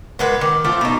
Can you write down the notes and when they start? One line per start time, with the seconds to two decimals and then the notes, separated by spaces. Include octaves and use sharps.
0.19 A#2 G#3 B4 F#5
0.41 D#3 D6
0.64 A3 C4 F4
0.81 B2 D#4